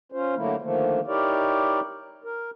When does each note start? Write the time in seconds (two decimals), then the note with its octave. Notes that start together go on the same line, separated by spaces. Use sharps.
0.12 C#4 F4 C5
0.36 D3 F#3 A3 A#3 E4
0.62 D3 D#3 F3 A3 A#3
1.07 D#4 E4 G4 A#4 C#5 D5
2.24 A#4